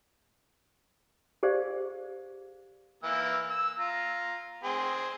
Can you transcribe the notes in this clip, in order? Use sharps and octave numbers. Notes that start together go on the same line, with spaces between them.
G4 G#4 C5 D5 F5
E3 A#3 E6
E6
F4 A#5
C4 G#4